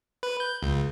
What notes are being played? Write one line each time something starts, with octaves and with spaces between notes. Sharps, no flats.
B4
G6
C#2